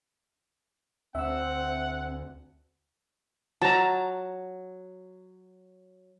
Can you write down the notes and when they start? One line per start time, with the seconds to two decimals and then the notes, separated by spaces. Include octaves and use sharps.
1.15 D2 C4 E5 F#5 E6
3.62 F#3 A5 A#5